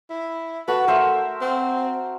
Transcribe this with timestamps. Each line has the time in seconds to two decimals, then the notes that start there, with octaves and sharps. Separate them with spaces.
0.10 E4
0.68 F#4 A4 B4
0.87 A3 A#4 C5 E5
1.41 C4